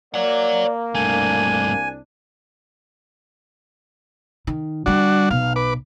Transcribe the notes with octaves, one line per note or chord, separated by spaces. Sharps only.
A#3 C#5 D5 F#5
C2 G2 A3 D4 G#5
D#3
D3 G3 D4 F#4
B1 F5
B4 D6